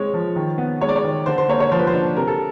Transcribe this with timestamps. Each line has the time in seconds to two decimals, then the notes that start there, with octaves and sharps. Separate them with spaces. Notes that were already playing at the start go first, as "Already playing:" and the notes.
Already playing: G#3 C4 C#5
0.14 F3
0.36 D#3
0.58 B3
0.81 G#3 C#5
0.89 D5
0.96 C#5
1.04 D#3
1.26 D3 C5
1.38 C5
1.48 A#3 C#5
1.60 C#5
1.71 F3 C5
1.79 B4
1.87 C5
1.94 D4
2.17 C3 A#4
2.27 A4